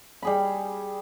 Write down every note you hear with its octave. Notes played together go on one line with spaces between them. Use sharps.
G3 G#4 B5